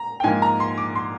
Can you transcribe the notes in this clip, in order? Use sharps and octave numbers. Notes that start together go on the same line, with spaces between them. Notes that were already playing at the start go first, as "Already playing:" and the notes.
Already playing: A#5
G5
G#2 F3 A#3 G#5
A#5
C6
D6
C6